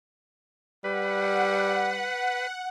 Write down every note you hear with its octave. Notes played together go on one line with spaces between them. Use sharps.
G3 B4 F#5